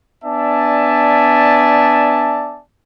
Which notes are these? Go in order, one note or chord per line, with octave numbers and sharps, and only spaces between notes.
B3 D4 D5 E5 G#5 A5